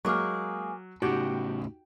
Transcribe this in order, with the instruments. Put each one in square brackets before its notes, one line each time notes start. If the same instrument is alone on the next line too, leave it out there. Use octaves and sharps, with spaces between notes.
[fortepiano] F#3 [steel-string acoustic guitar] G#3 A#3 G#4 [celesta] C#6 D6 F6
[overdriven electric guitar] A2 C#3 [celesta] D#4 [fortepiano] F#4 G4 [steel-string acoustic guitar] G5